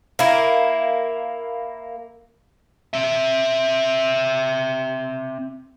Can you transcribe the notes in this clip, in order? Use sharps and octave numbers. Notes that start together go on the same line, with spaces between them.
A#3 E4
C4 E5